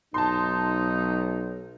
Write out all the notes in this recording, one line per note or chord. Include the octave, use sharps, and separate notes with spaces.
B1 D#4 A5 C6